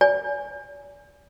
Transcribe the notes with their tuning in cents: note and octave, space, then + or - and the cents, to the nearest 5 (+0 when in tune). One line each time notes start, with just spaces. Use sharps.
D5 -40 G#5 +0